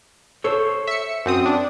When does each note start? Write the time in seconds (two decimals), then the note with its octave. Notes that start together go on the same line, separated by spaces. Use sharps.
0.44 A4 C5 C#5
0.87 E5 C#7
1.26 F#2 C4 D#6
1.46 D4